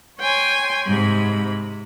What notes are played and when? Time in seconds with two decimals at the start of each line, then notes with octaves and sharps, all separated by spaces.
0.19 C#5 G5 G#5 C6
0.86 G#2 C3 B5